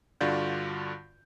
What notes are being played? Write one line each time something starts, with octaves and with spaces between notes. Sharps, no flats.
G2 D3 F4 F#4 D5 G6